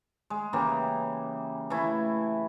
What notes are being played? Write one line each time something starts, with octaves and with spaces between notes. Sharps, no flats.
G#3
C#3 E3 A#3 G4
E3 A3 E4